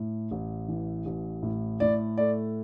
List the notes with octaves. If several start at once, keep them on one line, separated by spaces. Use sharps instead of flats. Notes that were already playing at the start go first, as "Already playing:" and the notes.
Already playing: A2
A1
E3
A1
A2
A2 D5
A3 D5